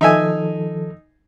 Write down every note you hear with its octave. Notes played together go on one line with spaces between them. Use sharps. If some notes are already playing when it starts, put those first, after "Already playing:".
D#3 F3 D#4 A4 E5 G#5